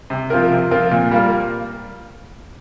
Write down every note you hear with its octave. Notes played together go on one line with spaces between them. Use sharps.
C3
F3 C4 F4 A#4
C3
F3 C4 F4 A#4
A#2
G3 A#3 F4 A#4